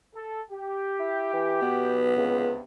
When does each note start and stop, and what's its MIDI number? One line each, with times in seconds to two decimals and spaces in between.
0.14 0.40 69
0.51 2.11 67
0.99 1.31 64
1.33 1.60 52
1.62 2.16 47
1.62 2.60 59
2.17 2.54 37
2.17 2.61 43
2.17 2.61 48